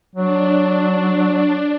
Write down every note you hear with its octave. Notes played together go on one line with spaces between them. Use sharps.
F#3 D4